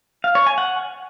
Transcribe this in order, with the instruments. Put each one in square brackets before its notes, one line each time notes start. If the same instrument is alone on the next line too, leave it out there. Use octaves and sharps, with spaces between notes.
[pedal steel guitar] F5
C#5
G#5
F#5